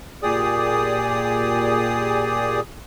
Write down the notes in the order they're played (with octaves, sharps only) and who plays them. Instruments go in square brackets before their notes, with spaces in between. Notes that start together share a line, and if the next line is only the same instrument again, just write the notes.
[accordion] A#2 G4 G#4 D5 D#6